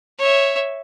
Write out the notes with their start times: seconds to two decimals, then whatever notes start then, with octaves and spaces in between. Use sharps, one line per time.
0.18 C#5 E5